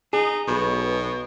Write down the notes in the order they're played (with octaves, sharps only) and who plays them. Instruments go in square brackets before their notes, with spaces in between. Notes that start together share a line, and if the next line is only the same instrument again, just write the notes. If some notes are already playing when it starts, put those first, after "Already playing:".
[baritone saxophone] D#4 [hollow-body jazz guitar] G#4
[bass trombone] B1 [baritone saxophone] B2